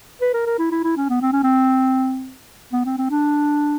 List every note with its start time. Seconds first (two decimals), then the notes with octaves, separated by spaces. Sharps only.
0.21 B4
0.34 A#4
0.46 A#4
0.59 E4
0.71 E4
0.84 E4
0.97 C#4
1.10 B3
1.22 C4
1.33 C#4
1.44 C4
2.73 B3
2.86 C4
2.98 C4
3.10 D4